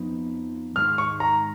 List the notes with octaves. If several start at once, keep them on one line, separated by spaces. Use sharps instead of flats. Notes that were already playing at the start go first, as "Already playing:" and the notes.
Already playing: F2 F3 B3 D#4
G#2 D#3 G#3 F6
C#6
A#5